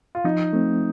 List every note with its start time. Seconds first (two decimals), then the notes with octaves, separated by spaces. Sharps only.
0.15 F4
0.25 F3 D#4
0.53 A3 C4